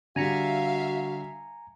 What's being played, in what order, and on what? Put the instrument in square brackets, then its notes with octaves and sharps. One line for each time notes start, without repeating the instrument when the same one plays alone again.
[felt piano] D3 G3 [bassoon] F#4 [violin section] E5 F5 [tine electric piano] G#5 A#5 C#7